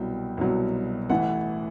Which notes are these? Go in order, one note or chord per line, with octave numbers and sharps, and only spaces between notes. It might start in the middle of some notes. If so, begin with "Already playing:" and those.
Already playing: C2 B2 F#3 G5
C2 B2 F#3
A1 A2 E3 F#5